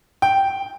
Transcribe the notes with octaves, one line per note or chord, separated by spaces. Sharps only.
G5